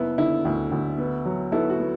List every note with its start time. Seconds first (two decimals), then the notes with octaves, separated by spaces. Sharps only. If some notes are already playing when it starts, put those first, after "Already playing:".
Already playing: F#1 B3 E4
0.18 D3 E4
0.45 D2
0.72 D2
0.98 B3
1.25 F#3
1.52 B3 E4 A4
1.70 F#4
1.79 B3